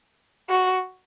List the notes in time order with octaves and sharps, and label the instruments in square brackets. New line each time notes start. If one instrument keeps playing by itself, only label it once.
[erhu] F#4